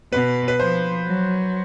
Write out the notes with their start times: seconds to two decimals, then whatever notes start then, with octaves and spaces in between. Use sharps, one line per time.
0.12 B2 B4
0.48 B4
0.60 F3 C5
1.07 F#3